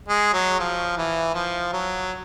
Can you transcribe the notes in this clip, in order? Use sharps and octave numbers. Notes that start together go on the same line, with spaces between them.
G#3
F#3
F3
E3
F3
F#3